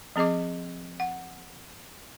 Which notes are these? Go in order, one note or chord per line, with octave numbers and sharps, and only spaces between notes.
F3 C4 G#4 D#5 D6
F#5